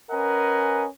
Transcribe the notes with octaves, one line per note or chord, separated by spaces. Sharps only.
C#4 A#4 B4 D#5 F#5 G#5